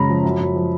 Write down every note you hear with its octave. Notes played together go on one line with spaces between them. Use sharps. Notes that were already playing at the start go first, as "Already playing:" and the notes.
Already playing: F#2 C#3 G#3 A#5 B5
F3
F#2
F#2
F3